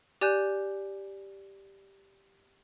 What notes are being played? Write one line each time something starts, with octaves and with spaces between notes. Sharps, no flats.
G4 D5 G#5 F#6 G6 E7